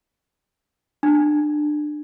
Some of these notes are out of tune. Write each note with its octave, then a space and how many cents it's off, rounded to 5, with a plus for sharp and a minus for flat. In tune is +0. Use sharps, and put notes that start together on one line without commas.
D4 +25